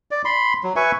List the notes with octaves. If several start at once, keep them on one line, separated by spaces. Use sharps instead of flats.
D5
B5 C6
F#3
B4 E5 G#5 C#6